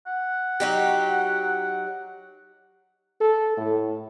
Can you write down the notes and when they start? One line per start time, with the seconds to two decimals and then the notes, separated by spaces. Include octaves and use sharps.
0.07 F#5
0.60 F#3 D#4 G4
3.21 A4
3.57 A2